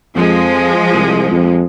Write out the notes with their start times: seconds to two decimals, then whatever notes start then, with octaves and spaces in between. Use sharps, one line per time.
0.16 F2 F3 G#3
0.93 C2
1.32 F2